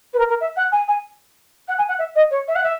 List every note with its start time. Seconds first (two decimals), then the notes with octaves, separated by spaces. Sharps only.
0.13 B4
0.18 A#4
0.28 A#4
0.40 E5
0.56 F#5
0.72 G#5
0.88 G#5
1.68 F#5
1.78 G#5
1.88 F#5
1.99 E5
2.15 D#5
2.30 C#5
2.48 E5
2.55 F#5
2.63 E5